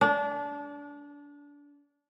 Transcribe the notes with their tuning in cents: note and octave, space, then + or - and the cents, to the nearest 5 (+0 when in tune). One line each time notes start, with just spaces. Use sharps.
D4 -25